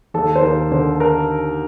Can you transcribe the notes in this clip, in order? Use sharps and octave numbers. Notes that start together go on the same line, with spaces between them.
D#2 A4
C5
D#2 A#4
D3 C5
A#4